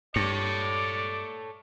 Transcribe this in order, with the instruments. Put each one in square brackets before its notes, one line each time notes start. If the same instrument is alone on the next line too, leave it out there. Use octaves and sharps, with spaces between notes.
[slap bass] G2 [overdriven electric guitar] A4 C#5 [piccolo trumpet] D5